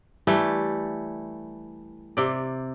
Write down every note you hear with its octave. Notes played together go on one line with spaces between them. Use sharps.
E3 G3 A3
C3 D5